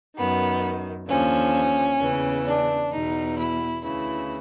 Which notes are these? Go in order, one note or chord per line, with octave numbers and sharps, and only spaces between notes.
F#2 D#3 B3
D#2 D3 F3 C#4
E2 C#3 E3
D4
E2 B2 D#4
E4
D2 C#3 E3 E4